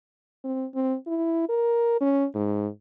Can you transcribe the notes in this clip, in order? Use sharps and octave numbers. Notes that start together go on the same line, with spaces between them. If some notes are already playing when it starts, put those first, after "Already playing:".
C4
C4
E4
A#4
C#4
G#2